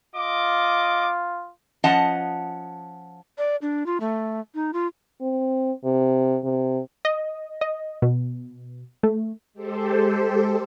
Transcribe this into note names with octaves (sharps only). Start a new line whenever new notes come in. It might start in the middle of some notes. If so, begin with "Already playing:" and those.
F4 D#5 D6
F3 C#4 D#5 F#5 A5
D5
D4
F4
A3
D#4
F4
C4
C3
C3
D#5
D#5
B2
A3
G#3 G4 A4 C5